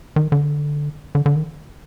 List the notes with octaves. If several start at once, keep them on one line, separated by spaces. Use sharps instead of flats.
D#3
D3
D3
D3
D#3